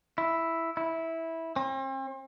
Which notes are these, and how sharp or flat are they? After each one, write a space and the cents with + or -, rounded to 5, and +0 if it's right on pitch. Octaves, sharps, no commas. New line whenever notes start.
E4 +0
E4 -10
C4 +40